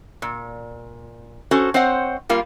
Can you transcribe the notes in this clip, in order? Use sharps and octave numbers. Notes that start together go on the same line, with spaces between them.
A#2
C#4 F#4 A4 C5
C4 C5 C#5 D#5 F#5
G3 A#3 F4